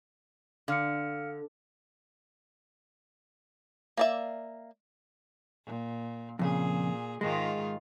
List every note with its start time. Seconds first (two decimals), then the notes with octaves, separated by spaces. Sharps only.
0.68 D3 F5 F6 C#7
3.97 A#3 D5 E5
5.65 A#2
6.39 F2 A#2 C#3 G#4
7.21 G#2 D#3 G#3 F4